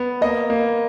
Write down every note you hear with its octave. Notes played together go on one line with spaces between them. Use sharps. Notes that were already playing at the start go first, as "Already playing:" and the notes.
Already playing: B3
A#3 D#5
A#3